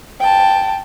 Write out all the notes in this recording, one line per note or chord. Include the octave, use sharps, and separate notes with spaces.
G5 A5